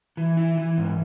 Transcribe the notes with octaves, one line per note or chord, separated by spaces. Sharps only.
E3
E4
E3
G#2